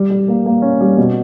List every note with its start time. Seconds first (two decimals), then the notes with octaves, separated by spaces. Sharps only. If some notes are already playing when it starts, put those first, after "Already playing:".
Already playing: G3
0.10 G3
0.28 A#3
0.46 A#3
0.62 C#4
0.81 G3
0.97 B2